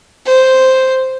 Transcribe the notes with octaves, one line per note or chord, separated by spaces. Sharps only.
C5